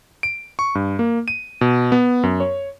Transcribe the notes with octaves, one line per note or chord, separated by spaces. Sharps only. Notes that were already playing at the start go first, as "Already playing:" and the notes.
D7
C#6
G2
A#3
D#7
B2
B3
F#2
C#5